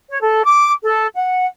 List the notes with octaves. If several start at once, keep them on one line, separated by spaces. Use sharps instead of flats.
C#5
A4
D6
A4
F#5